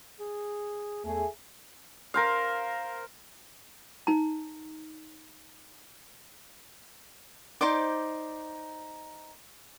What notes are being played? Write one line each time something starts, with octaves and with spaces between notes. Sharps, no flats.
G#4
E2 A3 G#4
A#4 C5 F5
D#4 A#5
D#4 C5 D5 D6